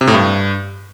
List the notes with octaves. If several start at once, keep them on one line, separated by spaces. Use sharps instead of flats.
C3
A2
G2